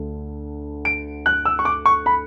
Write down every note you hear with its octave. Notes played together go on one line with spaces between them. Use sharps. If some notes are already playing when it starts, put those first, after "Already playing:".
Already playing: D2 D3
D7
F#6
E6
C#6
D6
C#6
B5